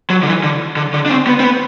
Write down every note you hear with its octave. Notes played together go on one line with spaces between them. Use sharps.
F#3
D3
E3
D3
D3
D3
D4
C4
B3
C4
B3